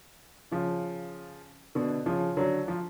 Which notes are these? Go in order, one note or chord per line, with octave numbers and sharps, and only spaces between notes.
C#3 F3
B2 D3
C#3 F3
D3 F#3
F3